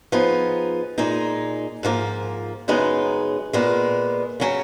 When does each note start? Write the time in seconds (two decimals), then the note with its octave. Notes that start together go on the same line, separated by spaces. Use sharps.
0.12 F3 B3 D#4 G#4
0.98 A#2 G#3 D#4 G#4
1.83 G#2 F3 A#3
2.68 F#2 C#3 G#3 B3 D#4
3.53 A#2 G#3 B3
4.40 C#3 F#3 C#4